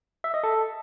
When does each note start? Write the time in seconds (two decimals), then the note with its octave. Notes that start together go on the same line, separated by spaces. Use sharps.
0.24 E5
0.34 D#5
0.44 A4